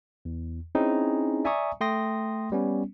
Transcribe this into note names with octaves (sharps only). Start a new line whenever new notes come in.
E2
C4 C#4 D#4 E4 G#4
D5 E5 G#5 A#5 C#6 D#6
A3 G5 C6 D#6 A#6
G3 B3 C#4